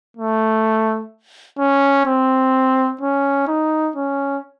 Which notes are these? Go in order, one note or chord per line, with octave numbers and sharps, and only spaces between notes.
A3
C#4
C4
C#4
D#4
C#4